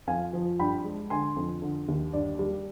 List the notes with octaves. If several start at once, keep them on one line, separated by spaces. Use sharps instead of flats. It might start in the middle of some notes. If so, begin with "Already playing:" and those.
F2 F5 G#5
F3
G2 G5 B5
G#3
D3 G#5 C6
F2
D3
D#2
G2 D5
G3